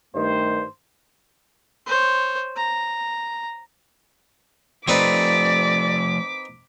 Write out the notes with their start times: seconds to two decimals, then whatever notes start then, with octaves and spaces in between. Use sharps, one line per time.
0.15 G2 D#3 A3 C5
1.86 C5 C#5
2.56 A#5
4.88 F3 A3 C4 D#4 B4 D5 D6 B6